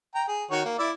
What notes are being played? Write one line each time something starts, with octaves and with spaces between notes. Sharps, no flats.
G5 A#5
G#4
D#3 F#4 C#5
A#3
E4 D5 E5